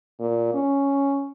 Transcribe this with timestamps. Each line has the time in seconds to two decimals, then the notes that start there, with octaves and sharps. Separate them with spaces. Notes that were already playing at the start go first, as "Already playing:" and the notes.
0.20 A#2
0.54 C#4